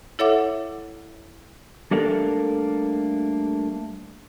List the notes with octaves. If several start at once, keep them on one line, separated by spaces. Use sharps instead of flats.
E4 A4 C#5 E5 F#5 D6
G3 A3 A#3 D4 A4 A#4